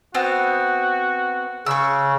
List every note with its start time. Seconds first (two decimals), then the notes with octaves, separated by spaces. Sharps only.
0.14 B3 C4 F#4
1.66 C#3 C#6 E6